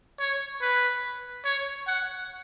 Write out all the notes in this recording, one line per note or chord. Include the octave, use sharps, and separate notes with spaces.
C#5
B4
C#5
F#5